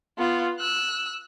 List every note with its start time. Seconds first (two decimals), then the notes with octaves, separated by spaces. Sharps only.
0.18 B3 F4
0.59 E6 F#6